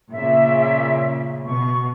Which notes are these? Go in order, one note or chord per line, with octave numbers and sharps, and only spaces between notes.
A#2 C#3 E5
B2 C#6